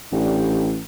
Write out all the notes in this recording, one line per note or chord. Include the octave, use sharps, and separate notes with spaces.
A1 D4 G4